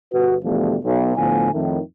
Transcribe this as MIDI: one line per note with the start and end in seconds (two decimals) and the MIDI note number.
0.12 0.36 31
0.12 0.36 66
0.12 0.36 71
0.44 0.76 40
0.44 0.76 47
0.44 0.76 50
0.44 0.76 53
0.44 0.76 55
0.44 0.76 57
0.84 1.15 35
1.17 1.52 38
1.17 1.52 45
1.17 1.52 50
1.17 1.52 53
1.17 1.52 59
1.17 1.52 80
1.53 1.79 41
1.53 1.79 45
1.53 1.79 51